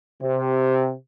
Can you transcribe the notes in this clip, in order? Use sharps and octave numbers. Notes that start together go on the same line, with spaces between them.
C3